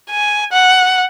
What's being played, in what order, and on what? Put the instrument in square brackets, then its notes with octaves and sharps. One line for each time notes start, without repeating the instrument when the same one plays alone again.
[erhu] G#5
F#5